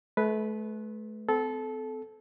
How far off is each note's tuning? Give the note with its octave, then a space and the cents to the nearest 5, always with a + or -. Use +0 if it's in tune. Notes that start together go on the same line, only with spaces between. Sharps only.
A3 -35 B4 +0
C4 -40 A4 -20